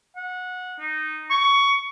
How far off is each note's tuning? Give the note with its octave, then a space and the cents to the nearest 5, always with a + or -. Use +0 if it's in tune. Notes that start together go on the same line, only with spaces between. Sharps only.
F#5 -20
D#4 -10
C#6 +15